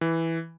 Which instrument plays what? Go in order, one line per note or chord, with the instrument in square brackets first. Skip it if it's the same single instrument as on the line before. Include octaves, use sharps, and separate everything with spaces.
[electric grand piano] E3